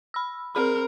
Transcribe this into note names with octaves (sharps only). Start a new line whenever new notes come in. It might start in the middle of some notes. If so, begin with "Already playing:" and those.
B5 E6
C4 G#4 A#4 B5